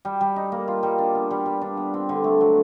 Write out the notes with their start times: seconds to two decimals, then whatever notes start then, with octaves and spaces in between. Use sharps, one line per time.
0.05 G3
0.21 G3
0.36 D#4
0.52 A#3
0.68 F4
0.83 G3
0.99 D4
1.15 B3
1.31 G3
1.46 G3
1.62 D4
1.77 B3
1.94 C4
2.09 D3
2.24 A3
2.41 F#3